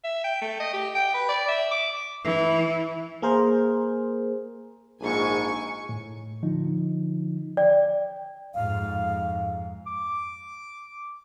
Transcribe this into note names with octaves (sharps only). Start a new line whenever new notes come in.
E5
G5
A3
D#5
G4
G5
B4
D5
E5
D6
E3
A#3 G#4 A#4 C5
A#1 G#2 G#5 C#6
A2
D3 F3 D#4
D5 G5
F2 G#2 F5
D6